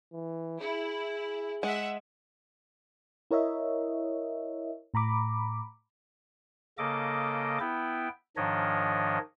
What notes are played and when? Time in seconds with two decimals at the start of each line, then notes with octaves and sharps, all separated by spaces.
0.13 E3
0.61 E4 G#4
1.63 G#3 E5 F#5
3.31 E4 A#4 C#5 D#5 E5
4.94 A2 A#5 B5 D6
6.78 C#3 A#3 A4 D#5 D6
7.60 B3 E4 G5
8.37 G#2 D#3 F3 D4 C#5 D#5